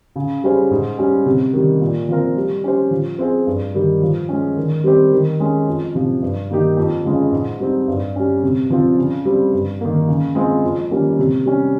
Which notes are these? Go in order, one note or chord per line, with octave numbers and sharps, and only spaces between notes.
C#3
G3 C#4 G#4 C5
G#2
G3 C#4
C3
D#3 G3
A#2
F3 C4 F4 A#4
G3
C#4 G4 C5
F3
C4 F4 G#4 C5
G2
D#3 G3
F3
G#3 C#4
D#3
G3 C4 G4 C5
D#3
G#3 C#4
F2
C3 F3
G2
D#3 A#3 D#4 G4
F2
C#3 G#3 C#4 F4
G#2
G3 C4 D#4
G2
G3 C#4
C3
F3 C4 F4
C#3
G3 C4
G2
D#3 A#3
C#3
G#3 C4 F4 C5
F2
D#3 G3 A#3 C#4
C3
G3 C#4